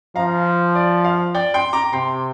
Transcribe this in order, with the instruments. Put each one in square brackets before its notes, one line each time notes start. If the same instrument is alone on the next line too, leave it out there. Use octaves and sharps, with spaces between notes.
[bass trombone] F3 [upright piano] F5 A#5
[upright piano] D5
F5
D5 G5
G5 C6
A#5 D6
[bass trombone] C3 [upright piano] G5 C6